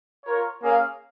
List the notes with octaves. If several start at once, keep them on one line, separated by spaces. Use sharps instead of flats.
F4 A#4 C#5
A#3 C#4 G#4 F5